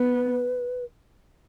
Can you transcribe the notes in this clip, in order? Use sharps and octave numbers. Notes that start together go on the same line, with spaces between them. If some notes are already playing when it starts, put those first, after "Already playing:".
Already playing: B3 B4